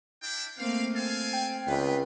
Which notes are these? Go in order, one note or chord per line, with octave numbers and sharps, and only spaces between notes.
D4 E4 G5
A3 A#3 C4 F5
C4 A4 F5 G#5
G5
C#2 F4 B4